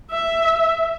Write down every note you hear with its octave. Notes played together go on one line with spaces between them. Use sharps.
E5